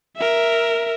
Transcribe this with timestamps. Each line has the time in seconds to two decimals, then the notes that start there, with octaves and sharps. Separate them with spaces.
0.17 A#4 E5